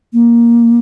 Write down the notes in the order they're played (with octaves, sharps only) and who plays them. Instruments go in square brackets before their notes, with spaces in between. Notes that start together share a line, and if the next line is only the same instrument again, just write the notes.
[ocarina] A#3